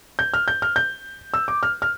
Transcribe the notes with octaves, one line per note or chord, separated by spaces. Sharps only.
G6
F6
G6
F6
G6
E6
D6
F6
F6